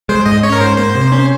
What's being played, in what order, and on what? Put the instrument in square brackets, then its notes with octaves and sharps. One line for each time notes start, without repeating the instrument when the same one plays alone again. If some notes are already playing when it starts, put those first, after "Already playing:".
[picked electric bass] G#3 [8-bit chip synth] C5
[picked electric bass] G#2 [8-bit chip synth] D#5
[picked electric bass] C#4 [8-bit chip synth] C#5
[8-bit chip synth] A#4
[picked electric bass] G#2 [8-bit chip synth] C5
[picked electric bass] A#3 [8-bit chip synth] C5
[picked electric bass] C3
C#4